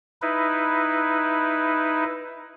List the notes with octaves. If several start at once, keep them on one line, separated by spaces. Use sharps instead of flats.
D#4 E4 B4